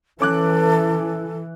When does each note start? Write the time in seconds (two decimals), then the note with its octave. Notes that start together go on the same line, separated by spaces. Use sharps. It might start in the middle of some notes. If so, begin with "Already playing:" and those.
0.20 E3 C#4 A4 D6 F#6